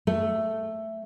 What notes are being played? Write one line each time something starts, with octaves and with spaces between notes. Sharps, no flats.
A3